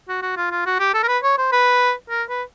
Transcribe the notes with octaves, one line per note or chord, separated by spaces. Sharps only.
F#4
F#4
F4
F4
F#4
G4
A4
A#4
B4
C#5
C5
B4
A#4
B4